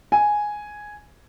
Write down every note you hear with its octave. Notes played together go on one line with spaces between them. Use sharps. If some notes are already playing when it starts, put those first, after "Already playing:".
G#5